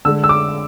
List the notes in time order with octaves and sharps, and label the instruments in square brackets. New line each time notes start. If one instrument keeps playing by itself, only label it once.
[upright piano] D3 G#3 E6
E6
D6